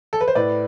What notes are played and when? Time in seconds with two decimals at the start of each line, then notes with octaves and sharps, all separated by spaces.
0.13 A4
0.21 B4
0.28 C5
0.35 A2 B4 D5